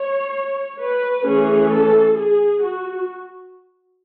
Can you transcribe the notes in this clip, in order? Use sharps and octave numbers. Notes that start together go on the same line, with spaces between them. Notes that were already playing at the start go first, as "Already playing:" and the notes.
Already playing: C#5
B4
E3 A3 C#4 G#4
A4
G#4
F#4